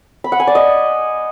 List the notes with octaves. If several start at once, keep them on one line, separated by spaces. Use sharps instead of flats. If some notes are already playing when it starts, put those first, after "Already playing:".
B5
F#5
G#5
D5
D#5